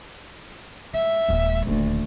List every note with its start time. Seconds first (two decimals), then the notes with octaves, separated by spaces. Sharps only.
0.94 G#3 E5
1.29 D#1 G#3
1.67 D#1 D2 D#3